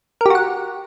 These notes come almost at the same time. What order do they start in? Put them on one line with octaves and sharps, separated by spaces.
A#4 G4 F#4 F#5